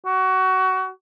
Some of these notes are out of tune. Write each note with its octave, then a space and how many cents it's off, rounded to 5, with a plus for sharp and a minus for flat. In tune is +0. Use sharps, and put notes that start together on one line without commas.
F#4 +25